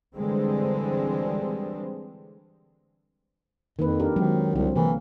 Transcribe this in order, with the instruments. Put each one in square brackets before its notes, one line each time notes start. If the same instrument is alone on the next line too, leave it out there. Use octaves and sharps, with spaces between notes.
[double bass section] D3 E3 G3 G#3 C4
[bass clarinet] F2 [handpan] D#3 A#3 B4
[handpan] D4 G4 A#4
[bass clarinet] D#3 [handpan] F#3 G#3 C4
[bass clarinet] C2 [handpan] D3 C4
[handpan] C3 A#3 A#4 [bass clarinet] E3